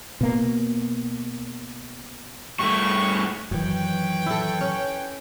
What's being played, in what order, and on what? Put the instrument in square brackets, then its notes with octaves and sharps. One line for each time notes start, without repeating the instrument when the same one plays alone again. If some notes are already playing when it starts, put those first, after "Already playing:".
[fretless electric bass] B2 A#3
[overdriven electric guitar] G2 A3 [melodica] C#6
[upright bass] F#2 D#3 [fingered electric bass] E3 F#3 [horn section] B4 C#5 G5
[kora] E4 A4
C#4